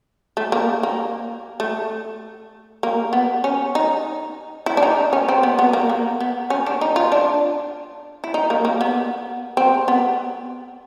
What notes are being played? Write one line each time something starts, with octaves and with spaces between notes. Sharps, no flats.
A3
A#3
A#3
A3
A#3
B3
C#4
D#4
E4
D4
D#4
C#4
C4
B3
B3
A#3
A#3
B3
C#4
D4
D#4
F4
D4
E4
D#4
A#3
A#3
B3
C4
B3